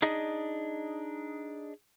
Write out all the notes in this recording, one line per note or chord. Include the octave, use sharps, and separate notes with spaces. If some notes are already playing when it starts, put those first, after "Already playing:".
D4 D#4 G#4 D#5